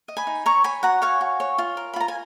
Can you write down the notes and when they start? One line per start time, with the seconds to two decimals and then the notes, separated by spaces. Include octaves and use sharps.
0.08 D#5
0.17 G#5 B5
0.27 D#4
0.46 C#5 A#5 C#6
0.64 C#5 G#5 B5
0.83 F#4 F#5 A#5
1.02 C#5 F5 G#5
1.21 F#4
1.40 C#5
1.58 F4
1.77 A#4
1.93 B5
1.96 F4 A#5
2.08 G#5